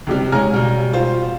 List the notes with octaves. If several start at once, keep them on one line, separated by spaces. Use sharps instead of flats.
C#2 C3 G3
C#3 G#3 G#5 A#5 F6
B2 G3
F4 C5